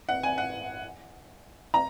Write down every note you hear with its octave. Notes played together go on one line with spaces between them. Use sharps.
F#5
G#5
F#5
A#5